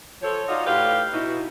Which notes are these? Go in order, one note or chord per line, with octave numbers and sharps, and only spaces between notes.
F3 A4 C#5
D#4 F4 F#4 D5 D#5 F5
A2 G4 B4 F5
B2 D#4 E4